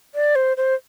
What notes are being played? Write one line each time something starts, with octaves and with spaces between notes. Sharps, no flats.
D5
C5
C5